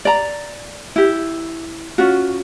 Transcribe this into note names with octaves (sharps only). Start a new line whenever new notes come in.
D5 A#5
E4 G4
C#4 F4 F#4